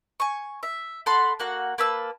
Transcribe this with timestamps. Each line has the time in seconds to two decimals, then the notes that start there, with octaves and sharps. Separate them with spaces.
0.20 G#5 C#6
0.63 E5
1.06 A4 F#5 B5 C6
1.40 A#3 F#4 F#5
1.78 A#3 B4 A5 E6